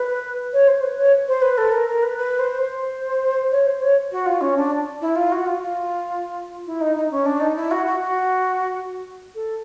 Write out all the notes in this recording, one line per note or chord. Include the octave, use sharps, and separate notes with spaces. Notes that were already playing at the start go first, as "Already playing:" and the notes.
Already playing: B4
C#5
C5
B4
C#5
C5
B4
A4
A#4
A#4
B4
B4
C5
C5
C#5
C5
C#5
F#4
F4
C#4
D4
E4
F4
F#4
F4
F4
E4
D#4
D#4
C#4
D4
D#4
E4
F#4
F#4
F#4
A4